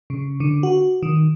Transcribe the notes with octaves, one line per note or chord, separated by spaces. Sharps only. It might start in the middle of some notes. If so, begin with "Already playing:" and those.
C#3
D3
F#4
D#3